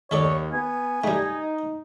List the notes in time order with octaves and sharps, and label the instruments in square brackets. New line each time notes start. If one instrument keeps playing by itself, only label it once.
[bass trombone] D#2 [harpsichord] D#3 A4 D5 [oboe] C#5
[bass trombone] B3 [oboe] G#5
[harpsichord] G3 A3 [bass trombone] D#4